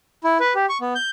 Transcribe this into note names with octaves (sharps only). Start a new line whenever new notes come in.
E4
B4
G4
C#6
B3
G6